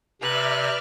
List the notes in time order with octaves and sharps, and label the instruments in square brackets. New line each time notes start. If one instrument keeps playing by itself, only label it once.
[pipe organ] C3 [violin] B4 F#6 [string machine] D5 E5 F6